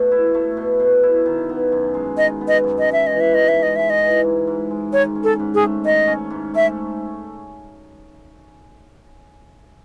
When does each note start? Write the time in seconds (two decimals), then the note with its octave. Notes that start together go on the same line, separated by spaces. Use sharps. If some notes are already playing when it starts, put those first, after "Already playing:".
Already playing: B2 A3
0.11 E4
0.34 A3
0.57 B2
0.80 B2
1.03 E4
1.26 D#3
1.49 B3
1.72 F#2
1.94 G#3
2.18 D#3 D#5
2.41 B3
2.48 D#5
2.64 F#2
2.79 D#5
2.87 G#3
2.93 E5
3.07 E3 D#5
3.20 E5
3.32 G#2 D#5
3.48 E5
3.55 G#2
3.63 D#5
3.76 G#3 E5
3.90 D#5
4.01 E3
4.24 G#2
4.47 G#2
4.71 G#3
4.93 D#3 C#5
5.16 C#4
5.24 A4
5.40 G#2
5.55 G#4
5.62 A3
5.85 D#3 D#5
6.07 C#4
6.30 G#2
6.54 A3 E5